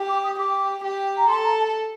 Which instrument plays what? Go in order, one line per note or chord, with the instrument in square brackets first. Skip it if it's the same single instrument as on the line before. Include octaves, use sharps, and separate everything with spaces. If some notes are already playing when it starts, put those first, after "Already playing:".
Already playing: [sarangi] G4
[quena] D6
D#6
[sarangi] G4 [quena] D6
[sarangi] G4
[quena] A#5
[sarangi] A4 [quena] C6
[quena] A#5
A5